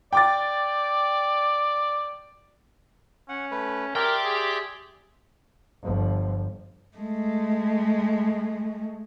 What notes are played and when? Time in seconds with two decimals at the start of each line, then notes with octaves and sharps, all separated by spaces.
0.13 D5 G5 D6 A6
3.29 C#4 F#5
3.51 A3 B4
3.95 G4 A#4 D5 E5 G5 C6
4.24 G#4
5.83 G1 F3
6.97 G#3 A3